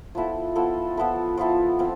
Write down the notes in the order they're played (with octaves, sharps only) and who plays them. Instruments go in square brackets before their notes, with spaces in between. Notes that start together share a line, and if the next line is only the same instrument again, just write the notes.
[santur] F3 B3 E4 A4
F3 B3 E4 A4
F3 B3 E4 A4
F3 B3 E4 A4
F3 C4